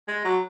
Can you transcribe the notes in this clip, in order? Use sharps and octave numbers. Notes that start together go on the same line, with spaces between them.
G#3
F#3